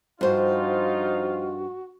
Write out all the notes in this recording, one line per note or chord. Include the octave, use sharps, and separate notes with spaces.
G2 F3 D#4 F4 F#4 C5